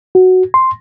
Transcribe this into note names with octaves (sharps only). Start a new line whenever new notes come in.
F#4
C6